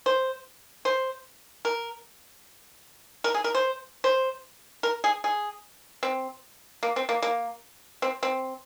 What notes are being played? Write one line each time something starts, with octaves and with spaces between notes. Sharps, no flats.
C5
C5
A#4
A#4
G#4
A#4
C5
C5
A#4
G#4
G#4
C4
A#3
C4
A#3
A#3
C4
C4